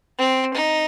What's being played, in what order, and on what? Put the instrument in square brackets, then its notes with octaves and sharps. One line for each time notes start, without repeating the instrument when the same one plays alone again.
[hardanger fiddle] C4
D#4